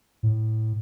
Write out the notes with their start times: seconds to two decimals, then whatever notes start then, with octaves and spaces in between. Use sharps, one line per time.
0.23 A2